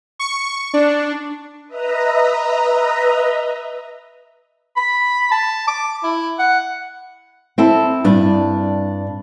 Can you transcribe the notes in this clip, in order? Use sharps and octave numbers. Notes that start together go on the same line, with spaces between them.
C#6
D4
B4 D#5 E5 A#5
B5
A5
D6
E4
F#5
C4 E4 A4
G2 D4